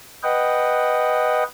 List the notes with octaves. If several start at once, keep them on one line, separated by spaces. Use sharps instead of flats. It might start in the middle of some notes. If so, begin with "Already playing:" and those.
B4 D#5 F#5 G5